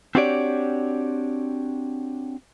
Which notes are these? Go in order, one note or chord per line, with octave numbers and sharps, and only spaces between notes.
C4 D4 F#4 G4 C#5 D5